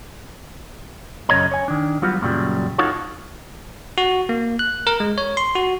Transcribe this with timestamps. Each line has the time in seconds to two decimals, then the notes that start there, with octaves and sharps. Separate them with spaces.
1.29 F#2 C#3 G3 C#5 D#5 A#5
1.51 C#5 G#5
1.68 D#3 D4
2.02 F#3 G3 B3 F4 F#4
2.21 F#2 A#2 C#3 F#3 G3
2.78 D#4 F4 F#4 A4 C#5
3.98 F#4
4.29 A#3
4.59 F#6
4.87 A#4
5.00 G#3
5.18 C#5
5.37 C6
5.55 F#4